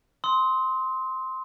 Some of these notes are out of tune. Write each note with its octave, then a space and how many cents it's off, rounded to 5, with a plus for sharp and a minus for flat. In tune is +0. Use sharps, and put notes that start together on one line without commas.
C6 +0 D#6 +40